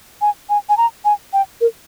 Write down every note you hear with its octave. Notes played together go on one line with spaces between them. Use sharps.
G#5
G#5
G#5
A#5
G#5
G5
A#4